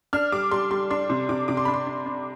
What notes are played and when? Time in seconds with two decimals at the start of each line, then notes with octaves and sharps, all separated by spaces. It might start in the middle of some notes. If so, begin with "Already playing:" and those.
0.13 D4 F6
0.32 G3 D6
0.51 G3 C6
0.71 G3 C6
0.90 D4 C6
1.10 C3
1.29 C3 D6
1.48 C3 D6
1.57 C6
1.65 D4 B5
1.74 C6
1.87 D4
2.06 D4